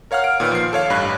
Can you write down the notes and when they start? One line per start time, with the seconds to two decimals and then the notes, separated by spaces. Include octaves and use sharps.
0.11 A#4 C#5 F5 F#5 F6
0.24 D7
0.40 A#2 D#3 B4
0.52 F3 C7
0.73 A4 C#5 F5
0.90 A1 G2 B5 F#6